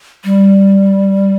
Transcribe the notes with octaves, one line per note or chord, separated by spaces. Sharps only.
G3